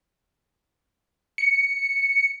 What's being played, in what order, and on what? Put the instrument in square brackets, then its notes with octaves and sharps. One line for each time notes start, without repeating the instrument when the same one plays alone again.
[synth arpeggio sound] C#7